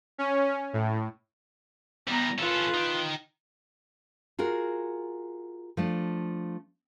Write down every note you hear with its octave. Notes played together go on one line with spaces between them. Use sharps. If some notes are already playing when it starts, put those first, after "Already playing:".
C#4
A2
E3 G3 B3 A#5
C#4 F4 A4 B4
D#4 G5
F4 F#4 G#4 A#4
F3 A3 D4